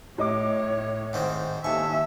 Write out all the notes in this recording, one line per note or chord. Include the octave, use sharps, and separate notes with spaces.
A2 C#5 D#5 D6
G#2 D#3 C4
D#2 E5 G#5 A5 C#6